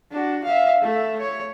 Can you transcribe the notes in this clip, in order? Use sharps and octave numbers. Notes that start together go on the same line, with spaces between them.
D4 F#4
E5 F5
A3 E5
C#5